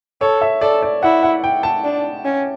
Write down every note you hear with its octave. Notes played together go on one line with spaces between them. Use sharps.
A4 C#5
E5
A4 D5
D5
E4 F#5
F#5
G5
A5
D4
C#4